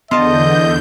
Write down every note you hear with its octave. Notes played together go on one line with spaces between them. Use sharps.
E2 D3 B3 F4 D#5 A5 G6